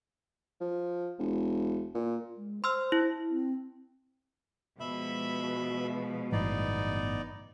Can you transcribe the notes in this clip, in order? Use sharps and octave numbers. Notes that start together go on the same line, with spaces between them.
F3
E1
A#2
G#3
C5 C6 E6 F6
E4
C4
B2 F3 G#3 E5 B5
G1 A2 E3 B3 D#4 D5